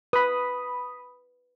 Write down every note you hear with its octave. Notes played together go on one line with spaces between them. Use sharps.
B4 B5 D#6